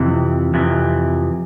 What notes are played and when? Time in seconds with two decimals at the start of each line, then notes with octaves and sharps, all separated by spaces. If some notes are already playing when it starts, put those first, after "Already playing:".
Already playing: F2 C3 E3
0.54 F2 C3 E3